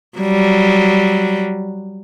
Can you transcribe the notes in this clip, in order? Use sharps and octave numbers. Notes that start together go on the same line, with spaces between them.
F#3 G3